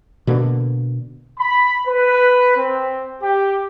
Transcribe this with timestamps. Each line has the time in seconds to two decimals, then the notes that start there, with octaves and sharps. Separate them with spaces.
0.27 B2 D3 A#3
1.39 B5
1.86 B4
2.56 C4
3.21 G4